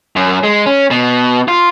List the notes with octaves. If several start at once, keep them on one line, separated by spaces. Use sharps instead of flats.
F#2
G#3
C#4
B2
F4